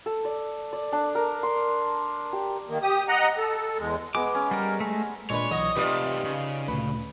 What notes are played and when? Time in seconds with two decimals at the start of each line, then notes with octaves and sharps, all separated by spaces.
0.06 A4
0.25 D5
0.73 D5
0.92 D4
1.15 A#4
1.43 C6
2.33 G4
2.67 D#3 A#3
2.82 G4 D#6
3.08 D#5 F#5 A#5
3.38 A4
3.79 E2 G#3
4.15 G#3 B3 D6
4.35 C#4
4.51 G3 A#4
4.80 G#3 A3
5.30 A#2 G#3 D4 B4 C#5
5.51 B1 E3 F#4 D#5
5.76 C3 A3 D#4 F4 G4 B4 D5
6.25 C#3
6.68 D2 A#2 B4